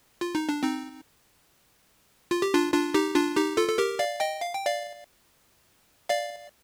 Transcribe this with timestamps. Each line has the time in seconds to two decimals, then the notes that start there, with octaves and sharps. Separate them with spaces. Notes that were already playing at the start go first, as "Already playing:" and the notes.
0.21 F4
0.35 D#4
0.49 D4
0.63 C4 D#4
2.31 F4
2.42 G4
2.54 D4 F4
2.73 D4 F4
2.94 D#4 G4
3.15 D4 F4
3.36 D#4 G4
3.57 F4 A4
3.69 A4
3.78 G4 A#4
3.99 D5 F5
4.20 D#5 G5
4.41 F5
4.54 G5
4.66 D5 F5
6.09 D5 F5